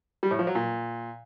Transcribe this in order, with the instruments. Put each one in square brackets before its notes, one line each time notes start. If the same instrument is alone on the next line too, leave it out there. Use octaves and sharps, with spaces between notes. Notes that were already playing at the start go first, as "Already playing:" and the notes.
[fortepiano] G3
A2
F3
F#3
A#2